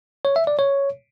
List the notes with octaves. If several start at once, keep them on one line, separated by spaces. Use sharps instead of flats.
C#5
E5
D5
C#5